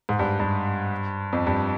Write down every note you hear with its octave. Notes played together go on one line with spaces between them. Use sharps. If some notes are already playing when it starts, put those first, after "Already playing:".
G#2
G2
G2
F2
G2